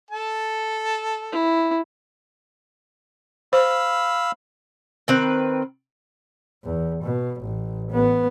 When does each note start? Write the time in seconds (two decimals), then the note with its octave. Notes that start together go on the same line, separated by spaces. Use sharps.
0.11 A4 A5
1.32 E4
3.53 C5 F5 B5 E6
5.08 D#3 C4 B4
6.64 E2
7.03 B2
7.41 A1
7.91 B3